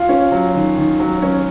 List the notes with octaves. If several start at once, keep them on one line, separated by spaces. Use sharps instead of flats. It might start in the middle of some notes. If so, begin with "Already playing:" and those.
Already playing: F4
C#4
F#3
D#3
D#3
F#3
C#4